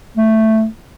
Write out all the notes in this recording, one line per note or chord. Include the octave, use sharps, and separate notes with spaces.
A3